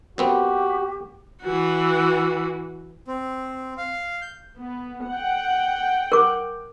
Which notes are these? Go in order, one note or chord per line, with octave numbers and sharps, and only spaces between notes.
F#2 B3 C4 F#4 G4
E3 F#4
C4
F5
G6
B3
F#5 G5
A#4 D6